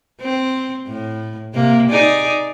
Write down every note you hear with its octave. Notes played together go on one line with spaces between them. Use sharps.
C4
A2
C3 A#3
D#4 G#4 D5